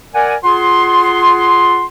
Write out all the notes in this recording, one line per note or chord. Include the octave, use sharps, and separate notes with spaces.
A#4 D5 F#5 G#5
F4 G#4 F#5 C6